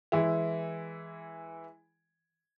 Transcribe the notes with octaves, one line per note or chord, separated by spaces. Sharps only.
E3 G#3 E4